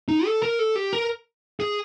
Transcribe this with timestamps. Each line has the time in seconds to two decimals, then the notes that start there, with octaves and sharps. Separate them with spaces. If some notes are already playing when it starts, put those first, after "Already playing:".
0.08 D#4
0.26 A4
0.43 A#4
0.59 A4
0.76 G4
0.93 A#4
1.60 G#4